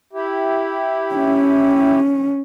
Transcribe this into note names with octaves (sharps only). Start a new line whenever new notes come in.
E4 G4
C#4